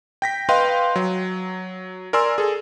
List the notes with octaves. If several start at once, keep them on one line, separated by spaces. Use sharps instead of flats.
G5 A#6 B6
B4 D#5 F5 G5 C6
F#3
A#4 D5 G#5 C6 E6
G#4 A4